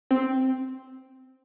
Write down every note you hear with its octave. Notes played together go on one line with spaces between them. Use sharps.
C4